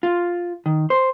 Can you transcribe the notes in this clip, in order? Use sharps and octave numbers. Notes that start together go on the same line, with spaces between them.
F4
D#3
C5